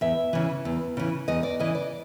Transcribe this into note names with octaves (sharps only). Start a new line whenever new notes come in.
E2 E5
C#3 E3
E2
C#3 E3
E2 D#5
D5
C#3 E3 D#5
D5